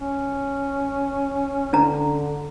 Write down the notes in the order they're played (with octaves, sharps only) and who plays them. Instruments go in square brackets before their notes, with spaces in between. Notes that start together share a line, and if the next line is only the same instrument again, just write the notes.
[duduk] C#4
[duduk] D3 [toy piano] C#4 D4 A#5